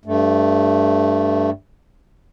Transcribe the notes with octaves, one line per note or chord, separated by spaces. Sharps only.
G2 A3